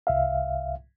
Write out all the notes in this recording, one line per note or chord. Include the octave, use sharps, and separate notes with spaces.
C2 E5 F5